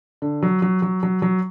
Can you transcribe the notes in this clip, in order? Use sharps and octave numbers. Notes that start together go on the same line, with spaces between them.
D3
F#3
F#3
F#3
F#3
F#3